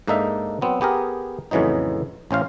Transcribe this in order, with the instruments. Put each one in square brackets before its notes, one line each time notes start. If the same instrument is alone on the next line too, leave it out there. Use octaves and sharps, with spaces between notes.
[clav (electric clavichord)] G#2 A#3 D4 D#4 A4 E5
F#3 B3 C4
B3 G4 G#4 A#4
F2 A2 C#3 E3 F#3 D#4
A1 C#4 C5 F5